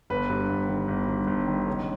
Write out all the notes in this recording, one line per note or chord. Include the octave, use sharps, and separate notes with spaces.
G1 B4
G2
G1
D#3
G1
G2
G1
D#3
C#2 C#5